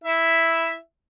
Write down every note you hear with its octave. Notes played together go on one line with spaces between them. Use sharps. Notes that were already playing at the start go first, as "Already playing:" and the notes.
E4 E5